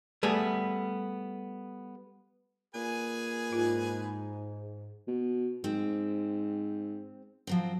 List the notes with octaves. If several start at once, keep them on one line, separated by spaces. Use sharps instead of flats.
G3 A3 B3 G#4
A#2 G#4 B4 G#5
G#2 F4
B2
G#2 C4
F3 F#3 C4